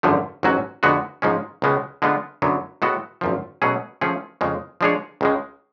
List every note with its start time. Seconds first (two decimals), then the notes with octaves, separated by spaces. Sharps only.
0.03 G#1 F#2 D3 F3 A3
0.43 A1 G#2 F#3 C#4 F#4
0.83 F2 D3 G#3 B3 F#4
1.22 G#2 F3 G#3 C#4
1.62 C#2 C#3 G#3 B3
2.02 D3 G#3 B3 F4
2.42 F#2 D3 F#3 B3
2.82 A2 G#3 B3 F#4 A4
3.21 G#1 F#2 F3
3.62 B2 F#3 A3 C#4 G#4
4.01 F3 A3 C#4 G#4
4.41 F2 C#3 G#3
4.81 F3 G#3 D4 G#4 C#5
5.21 C#2 C#3 G#3